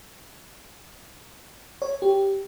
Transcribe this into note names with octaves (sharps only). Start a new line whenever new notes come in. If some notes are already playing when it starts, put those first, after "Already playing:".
C#5
G4